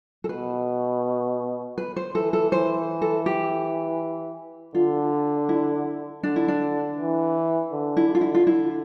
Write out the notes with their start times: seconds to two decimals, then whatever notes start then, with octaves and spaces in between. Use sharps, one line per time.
0.24 A4
0.29 B2 B4
1.78 B4
1.96 C5
2.14 E3 A4
2.33 A4
2.52 E3 C5
3.02 A4
3.26 G4
4.75 D3 F4
5.49 E4
6.23 D3 D4
6.36 E4
6.48 D4
6.98 E3
7.72 D3
7.97 E4
8.08 D3
8.15 F4
8.21 E4
8.34 F4
8.46 D3 E4